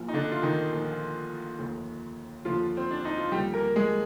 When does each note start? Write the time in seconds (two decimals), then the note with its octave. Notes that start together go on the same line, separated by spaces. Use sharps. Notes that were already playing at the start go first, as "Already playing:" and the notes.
Already playing: A#1 A#2 F3
0.08 D#4
0.14 D3 D4
0.32 F4
0.43 D#3 D#4
0.72 A#1 A#2 F3
1.58 F1 D#2 D3 F3
2.45 F1 D#2 D3 F3 F4
2.77 C4
2.91 D4
3.05 D#4
3.18 F4
3.32 D#2 D3 F3 G3 G4
3.54 A#3 A#4
3.76 G#3 G#4